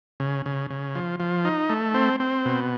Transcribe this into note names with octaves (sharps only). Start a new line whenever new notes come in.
C#3
C#3
C#3
F3
F3
D#4
A3
C4
C4
B2